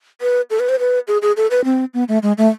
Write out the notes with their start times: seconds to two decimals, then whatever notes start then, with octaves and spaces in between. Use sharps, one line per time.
0.21 B4
0.50 A4
0.60 B4
0.69 C5
0.79 B4
1.08 G#4
1.22 G#4
1.37 A4
1.51 B4
1.65 C4
1.94 B3
2.08 A3
2.23 G#3
2.38 A3